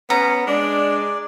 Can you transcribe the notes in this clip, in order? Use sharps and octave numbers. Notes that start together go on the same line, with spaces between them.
B3 C#4 A#5
G#3 D4 D5